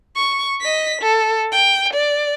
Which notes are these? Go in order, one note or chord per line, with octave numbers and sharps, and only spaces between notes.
C#6
D#5 B6
A4
G5
D5